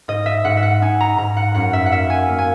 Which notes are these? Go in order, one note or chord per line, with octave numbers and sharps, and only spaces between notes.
G#2 D#5
E5
G#2 F#5
E5
F#5
D#4 G#5
A#5
G#2 A#5
F#5
F#2 F#5
E5
F#5
A#3 E5
G#5
A#3
G#5